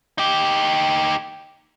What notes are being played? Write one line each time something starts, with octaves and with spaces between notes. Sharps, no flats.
D#4 G4